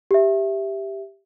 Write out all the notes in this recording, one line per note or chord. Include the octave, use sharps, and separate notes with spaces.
G4 E5